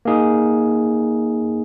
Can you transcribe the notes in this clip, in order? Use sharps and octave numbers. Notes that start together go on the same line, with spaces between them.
A#3 D#4 G#4